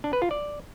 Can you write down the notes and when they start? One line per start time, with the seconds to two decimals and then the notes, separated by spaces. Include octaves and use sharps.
0.04 D4
0.13 B4
0.22 F4
0.31 D5